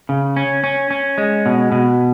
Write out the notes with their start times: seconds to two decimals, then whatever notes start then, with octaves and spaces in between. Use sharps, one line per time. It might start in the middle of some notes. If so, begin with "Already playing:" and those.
0.09 C#3
0.36 C#4
0.64 C#4
0.91 C#4
1.18 G#3
1.46 B2
1.72 B2